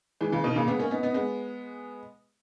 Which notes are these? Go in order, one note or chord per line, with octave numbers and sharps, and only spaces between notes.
E3 G#3
C#3 E3
B2 D#3
A#2 C#3
G#3 B3
A#3 C#4
B3 D#4
B3 D#4
G#3 B3